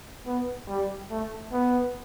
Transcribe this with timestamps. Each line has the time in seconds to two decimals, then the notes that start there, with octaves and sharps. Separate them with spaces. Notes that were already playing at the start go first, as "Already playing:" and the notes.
0.26 B3
0.68 G3
1.11 A3
1.53 B3